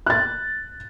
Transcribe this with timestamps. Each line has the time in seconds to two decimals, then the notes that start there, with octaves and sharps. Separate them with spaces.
0.06 F#6 A6